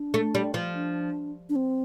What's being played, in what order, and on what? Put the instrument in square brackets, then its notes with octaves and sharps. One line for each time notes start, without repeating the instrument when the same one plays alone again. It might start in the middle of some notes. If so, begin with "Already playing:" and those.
Already playing: [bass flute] D4
[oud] A3
G3
F3
[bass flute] D4
D4
C4